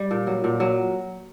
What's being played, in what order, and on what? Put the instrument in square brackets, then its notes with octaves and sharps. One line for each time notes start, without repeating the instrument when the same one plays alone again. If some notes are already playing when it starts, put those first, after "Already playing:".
Already playing: [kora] G3
A#2
F#3
A#2
F#3